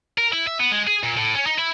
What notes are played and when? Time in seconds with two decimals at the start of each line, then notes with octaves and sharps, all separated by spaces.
0.18 A#4
0.32 E4
0.47 E5
0.59 B3
0.72 G#3
0.87 G#4
1.04 A#2
1.17 A2
1.35 C#4
1.46 D#4
1.59 E4